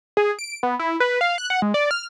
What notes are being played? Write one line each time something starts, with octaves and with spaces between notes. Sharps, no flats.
G#4
D7
B3
E4
B4
F5
F#6
F#5
G#3
D5
F6